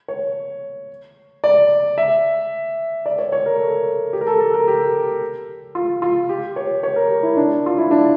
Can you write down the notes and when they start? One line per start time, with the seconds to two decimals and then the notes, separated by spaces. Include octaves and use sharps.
0.08 C#5
1.44 D5
1.98 E5
3.06 D5
3.19 C#5
3.32 C#5
3.46 A#4
3.59 A4
4.13 G4
4.21 A#4
4.27 A4
4.40 A4
4.54 A#4
4.68 G4
5.75 F4
6.02 F4
6.29 G4
6.56 C#5
6.83 C#5
6.96 A#4
7.10 G4
7.23 E4
7.37 D4
7.66 F4
7.78 E4
7.91 D4